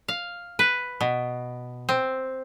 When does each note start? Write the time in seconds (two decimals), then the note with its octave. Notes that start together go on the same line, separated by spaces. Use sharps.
0.08 F5
0.59 B4
1.01 B2
1.89 C4